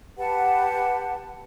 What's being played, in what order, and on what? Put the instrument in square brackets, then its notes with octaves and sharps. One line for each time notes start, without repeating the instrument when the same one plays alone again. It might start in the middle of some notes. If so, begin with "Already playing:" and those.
[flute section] G4 B4 F#5 A5